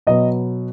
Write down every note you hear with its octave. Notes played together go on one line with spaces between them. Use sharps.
B2 F#3 B3 D#5